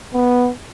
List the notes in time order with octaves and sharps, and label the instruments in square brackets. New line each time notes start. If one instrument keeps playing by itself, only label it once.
[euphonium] B3